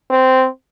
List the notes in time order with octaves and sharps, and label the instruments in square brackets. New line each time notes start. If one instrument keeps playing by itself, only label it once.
[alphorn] C4